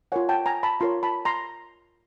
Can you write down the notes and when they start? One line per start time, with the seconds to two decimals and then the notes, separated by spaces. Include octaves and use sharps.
0.12 F4 A#4 C#5 F#5 G#5
0.29 G5 A5
0.46 G#5 A#5
0.63 A5 B5
0.80 F4 A#4 C#5 A#5 C6
1.03 A5 B5
1.25 A#5 C6